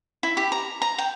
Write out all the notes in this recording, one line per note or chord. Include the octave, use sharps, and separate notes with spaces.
E4
G4
A#5
A#5
G5